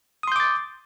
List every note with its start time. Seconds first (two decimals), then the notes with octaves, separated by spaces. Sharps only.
0.23 D#6
0.28 C6
0.32 G6
0.36 D6
0.40 A6